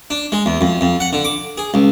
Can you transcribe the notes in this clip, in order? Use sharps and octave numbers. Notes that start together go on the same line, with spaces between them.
D4
G#3
E2
F2
F2
F#5
D3
D6
G#4
C#2